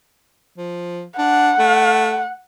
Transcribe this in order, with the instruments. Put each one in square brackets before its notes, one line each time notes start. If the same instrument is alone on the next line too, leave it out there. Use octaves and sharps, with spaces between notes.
[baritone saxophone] F3
[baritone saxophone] D4 [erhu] F#5
[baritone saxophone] A3